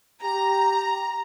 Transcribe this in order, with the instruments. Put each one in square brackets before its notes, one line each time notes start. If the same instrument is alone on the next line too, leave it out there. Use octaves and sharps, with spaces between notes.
[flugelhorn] G4 [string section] A#5